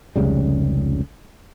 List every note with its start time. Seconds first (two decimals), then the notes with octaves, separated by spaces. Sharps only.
0.16 F1 C#2 C#3 G3